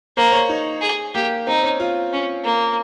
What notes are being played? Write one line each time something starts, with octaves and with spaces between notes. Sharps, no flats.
A#3 C5
C#5
D#4
G#4
A#3 G4
C4 D#4
C#4
F4
C#4
A#3